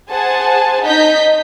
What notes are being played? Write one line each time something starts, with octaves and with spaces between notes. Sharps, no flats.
G#4 C5 F#5 G#5 A5
D#4 D#5 G6 B6